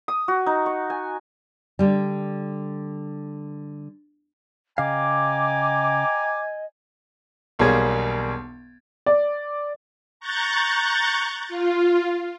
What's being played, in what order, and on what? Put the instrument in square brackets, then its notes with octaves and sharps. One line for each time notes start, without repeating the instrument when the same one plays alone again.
[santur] D#6
F#4
D#4
C#6
G#5
[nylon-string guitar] D3 G3
[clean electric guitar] C#3 F5 [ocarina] D#5 [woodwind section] G5 A#5 D6 [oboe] G#5
[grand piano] E1 B1 G3 A#3 G#4 G#6
[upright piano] D5
[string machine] A#5 C#6 F#6 G6 A6
F4